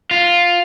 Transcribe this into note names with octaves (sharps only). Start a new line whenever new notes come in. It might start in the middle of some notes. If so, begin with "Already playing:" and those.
F4